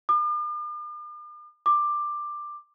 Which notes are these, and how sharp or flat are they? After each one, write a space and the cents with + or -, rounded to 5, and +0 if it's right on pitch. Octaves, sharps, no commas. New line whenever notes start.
D6 +45
D6 +15